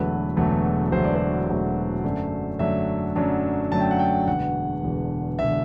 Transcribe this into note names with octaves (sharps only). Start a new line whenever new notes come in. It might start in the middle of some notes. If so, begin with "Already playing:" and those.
Already playing: E1 E2 D3 F#3 A3 B4
E1 E2 D3 F#3 A3
E1 E2 D3 F#3 A3 C5
D5
C5
E1 E2 D3 F#3 A3
F#2 D3 F#3 A3 D4
F#2 D3 F#3 A3 D4 E5
F#2 D3 F#3 A3 D4
F#2 D3 F#3 A3 D4 A5
G5
F#5
G5
E1 E2 D3 F#5
E1 E2 D3
E1 D3 E5